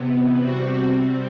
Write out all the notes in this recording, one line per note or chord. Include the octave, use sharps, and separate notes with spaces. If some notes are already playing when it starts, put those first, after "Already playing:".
Already playing: E2 C3 E3 B3
C3 G3 C4 F#4